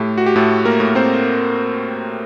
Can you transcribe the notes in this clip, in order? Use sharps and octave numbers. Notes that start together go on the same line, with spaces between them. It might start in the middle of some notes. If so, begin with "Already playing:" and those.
Already playing: A2 A3 G4
F#4
G4
A2 A3 A4
A#3 A#4
A2
C4 C5